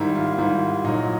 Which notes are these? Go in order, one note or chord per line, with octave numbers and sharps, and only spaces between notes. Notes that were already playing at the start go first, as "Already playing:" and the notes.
Already playing: G#2 D#3 G3 E4
F4
G#2 D#3 G3 E4
A#2 F#3 D#4